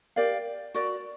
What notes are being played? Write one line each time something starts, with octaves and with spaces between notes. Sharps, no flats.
G4 A#4 D5 F5
F#4 A#4 D5